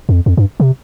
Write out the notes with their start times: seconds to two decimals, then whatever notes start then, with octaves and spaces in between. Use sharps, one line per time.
0.09 F2
0.26 F2
0.37 G2
0.60 C3